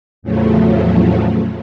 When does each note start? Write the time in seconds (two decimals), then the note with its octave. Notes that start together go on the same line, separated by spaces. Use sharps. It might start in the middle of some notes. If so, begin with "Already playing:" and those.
0.22 E2 A2 C#3 F3 F#3 A3